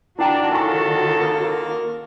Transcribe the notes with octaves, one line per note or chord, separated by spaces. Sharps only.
D#3 D4 E4 F#4 A#4 G5 A#5
C#3 E4 F4 A4 G#5 C#6
A#3